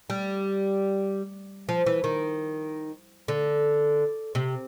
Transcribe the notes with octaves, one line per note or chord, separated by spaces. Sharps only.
G3
F3
E3
D#3
D3
C3